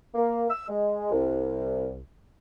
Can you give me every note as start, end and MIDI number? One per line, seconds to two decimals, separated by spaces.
0.15 0.46 58
0.50 0.67 88
0.68 1.08 56
1.11 1.97 36